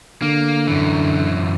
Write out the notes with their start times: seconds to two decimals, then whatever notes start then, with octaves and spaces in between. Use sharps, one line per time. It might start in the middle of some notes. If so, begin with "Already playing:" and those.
0.22 D3 A#3
0.67 F#2 E3